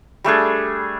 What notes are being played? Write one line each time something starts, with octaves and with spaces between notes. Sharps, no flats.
G3 A3 D4 G#4